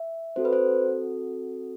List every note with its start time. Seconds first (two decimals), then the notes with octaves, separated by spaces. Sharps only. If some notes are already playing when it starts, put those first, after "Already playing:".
Already playing: E5
0.36 C4 F#4 A4 C5
0.45 B4
0.53 C5